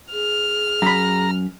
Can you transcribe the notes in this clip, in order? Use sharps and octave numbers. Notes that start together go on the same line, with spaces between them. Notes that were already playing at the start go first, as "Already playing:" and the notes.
G#4 F6
F#2 A#5 B5